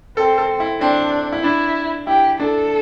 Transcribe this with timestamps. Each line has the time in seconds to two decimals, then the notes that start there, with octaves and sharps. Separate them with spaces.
0.17 C4 A4
0.38 A4
0.60 E4
0.80 C4 D4
1.32 E4
1.44 D4 E4
2.07 E4 G4
2.39 D4 A4